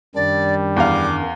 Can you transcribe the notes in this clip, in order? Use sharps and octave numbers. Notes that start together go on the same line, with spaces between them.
F#2 D#3 G3 D4 D5
E2 F5 D6